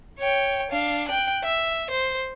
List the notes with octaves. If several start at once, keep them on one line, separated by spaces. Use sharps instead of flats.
C#5 G5
D4 F5
G5 F#6
E5
C5